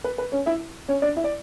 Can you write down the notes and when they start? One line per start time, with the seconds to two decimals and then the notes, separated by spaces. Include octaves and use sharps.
0.04 B4
0.18 B4
0.32 C#4 C#5
0.46 E4 E5
0.89 C#4 C#5
1.02 D4 D5
1.16 E4 E5
1.24 D5